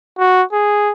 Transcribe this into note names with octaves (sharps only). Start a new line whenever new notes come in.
F#4
G#4